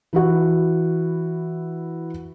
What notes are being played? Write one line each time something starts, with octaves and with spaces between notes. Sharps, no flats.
E3 E4 F#4